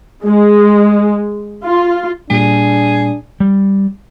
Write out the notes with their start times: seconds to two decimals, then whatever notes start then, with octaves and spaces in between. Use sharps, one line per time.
0.23 G#3
1.64 F4
2.30 A#2 G3 D4 G#4
3.40 G3